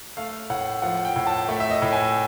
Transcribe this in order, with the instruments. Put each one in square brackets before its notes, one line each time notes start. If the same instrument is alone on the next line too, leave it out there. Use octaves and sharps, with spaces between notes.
[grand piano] A3 F5
A2 F#5
F3 F#5
G5
A2
A5
A3 E5
E5
D#5
A2
G#5